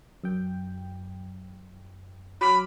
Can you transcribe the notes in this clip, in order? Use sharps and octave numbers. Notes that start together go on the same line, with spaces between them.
F#2 G5
F#3 B5 D6 F6